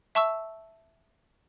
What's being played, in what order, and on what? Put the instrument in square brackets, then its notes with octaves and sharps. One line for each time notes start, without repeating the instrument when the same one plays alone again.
[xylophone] E5 A5 C#6 E6